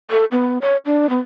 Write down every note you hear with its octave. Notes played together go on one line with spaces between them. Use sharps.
A4
B3
C#5
D4
B3